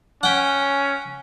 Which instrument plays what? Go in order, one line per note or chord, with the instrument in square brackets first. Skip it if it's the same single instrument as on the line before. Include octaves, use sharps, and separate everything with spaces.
[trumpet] C#4 [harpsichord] F#5 G5